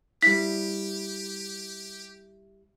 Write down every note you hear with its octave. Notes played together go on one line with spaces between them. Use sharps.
G3 E4 G4 B6